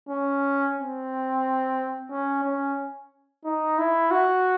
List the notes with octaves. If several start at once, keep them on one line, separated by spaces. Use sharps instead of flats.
C#4
C4
C#4
C#4
D#4
E4
F#4